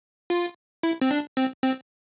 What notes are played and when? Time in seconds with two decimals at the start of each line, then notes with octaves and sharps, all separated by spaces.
0.30 F4
0.83 E4
1.02 C4
1.11 D4
1.37 C4
1.63 C4